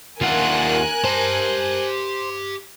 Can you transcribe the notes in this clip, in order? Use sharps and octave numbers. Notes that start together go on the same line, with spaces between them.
D#2 D4 F4 A#4 F#5 G#5 F#6
G4 C5 A5